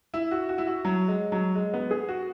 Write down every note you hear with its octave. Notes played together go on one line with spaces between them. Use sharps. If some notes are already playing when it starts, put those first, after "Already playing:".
E4
F#4
F#4
E4
F#4
F#3
G#3
F#3
G#3
B3
G#4
F#4